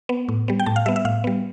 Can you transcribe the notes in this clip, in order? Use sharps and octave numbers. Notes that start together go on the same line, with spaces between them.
B3
A2
G3 B3
G5
A2 A5
F5
G3 B3 E5
E5
A2 F5
G3 B3